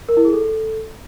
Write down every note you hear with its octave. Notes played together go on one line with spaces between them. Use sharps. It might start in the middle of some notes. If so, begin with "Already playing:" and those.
A#4
E4
G#4
A4